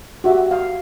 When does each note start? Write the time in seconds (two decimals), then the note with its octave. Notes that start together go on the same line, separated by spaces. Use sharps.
0.24 F#4 G4 E5
0.51 F5